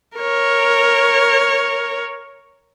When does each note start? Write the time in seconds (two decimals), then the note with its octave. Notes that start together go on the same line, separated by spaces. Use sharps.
0.17 A#4 C#5